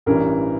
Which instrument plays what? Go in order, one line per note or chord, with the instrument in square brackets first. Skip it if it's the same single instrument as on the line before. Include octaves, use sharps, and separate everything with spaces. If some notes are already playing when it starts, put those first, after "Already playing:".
[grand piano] A1 G2 E3 G3 A#4